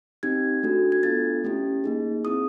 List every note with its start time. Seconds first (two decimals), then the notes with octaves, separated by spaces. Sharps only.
0.23 C4 D#4 G4 G#6
0.63 A3 D4 F#4 A4
0.92 G#6
1.03 B3 D4 F4 A4 A6
1.44 A3 C#4 E4 G4
1.84 A#3 D#4 G#4
2.24 C4 E4 G#4 D#6